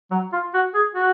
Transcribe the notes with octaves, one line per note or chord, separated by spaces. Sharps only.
F#3
F4
F#4
G#4
F#4